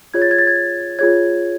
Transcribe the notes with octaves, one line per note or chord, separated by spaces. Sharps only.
F4 G#4 C#5 G#6
A6
G#6
A6
G#6
A6
F4 G#4 C#5 G#6